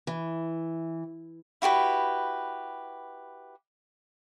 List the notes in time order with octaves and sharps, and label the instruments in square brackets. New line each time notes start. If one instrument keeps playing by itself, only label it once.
[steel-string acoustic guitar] E3
[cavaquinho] E4 F#4 G4 B4